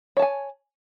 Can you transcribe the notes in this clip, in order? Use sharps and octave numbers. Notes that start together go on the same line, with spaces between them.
C#5 G#5 A5